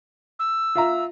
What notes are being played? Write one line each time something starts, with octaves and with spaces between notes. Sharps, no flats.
E6
F4 E5 A#5